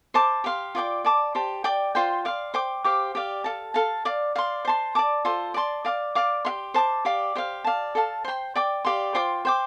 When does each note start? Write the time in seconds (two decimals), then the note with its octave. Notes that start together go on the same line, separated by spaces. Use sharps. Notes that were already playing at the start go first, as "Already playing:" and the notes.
0.14 C5 A5 D6
0.44 G4 F5 C6
0.75 F4 D5 G5 D6
1.05 D5 A5 D6
1.35 G4 C5 A5
1.64 D5 G5 D6
1.95 F4 C5 G5
2.25 D5 F5 C6
2.54 C5 G5 D6
2.84 G4 C5 F5 D6
3.15 G4 D5 F5
3.44 A4 F5 A5
3.74 A4 F5 A5
4.05 D5 F5 D6
4.35 D5 F5 C6
4.65 C5 A5 C6
4.95 D5 A5 D6
5.25 F4 A4 C5
5.54 D5 A5 C6
5.85 D5 F5 D6
6.15 D5 F5 D6
6.45 G4 F5 C6
6.74 C5 A5 D6
7.05 G4 D5 F5 D6
7.35 G4 C5 F5
7.64 D5 F5 A5
7.95 A4 F5 A5
8.25 C5 G5 C6
8.55 D5 G5 D6
8.85 G4 D5 F5 C6
9.15 F4 C5 G5 D6
9.45 C5 G5 D6